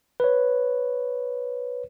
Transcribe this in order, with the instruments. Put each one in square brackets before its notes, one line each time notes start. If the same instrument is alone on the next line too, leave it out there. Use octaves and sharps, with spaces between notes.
[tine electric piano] B4 C#5